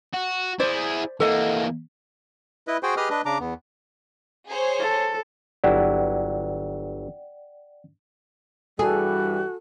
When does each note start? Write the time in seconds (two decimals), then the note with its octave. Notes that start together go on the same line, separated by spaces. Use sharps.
0.13 F#4
0.60 E4 G#4 C5 D5
1.20 E3 A#3 A4 D#5 F#5
2.67 E4 B4 D#5
2.83 F#4 G#4 C5 G5 G#5
2.97 G4 G#4 B4 D#5 D#6 F6
3.10 D4 B4 D#5
3.25 C#3 D4 A#5 D6
3.40 E2 B3
4.48 G#4 C5 C#5
4.79 A4
5.64 G1 F#3 E4 D5 F#5 G5
8.79 G2 E3 G3 F#4 G#4 A4